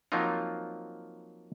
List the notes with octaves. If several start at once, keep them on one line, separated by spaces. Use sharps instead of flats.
F3 F#3 A#3 C4 D#4 F4